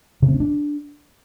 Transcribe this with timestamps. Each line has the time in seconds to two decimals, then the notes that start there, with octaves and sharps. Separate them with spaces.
0.22 C#3
0.28 C4
0.34 C#4
0.40 D4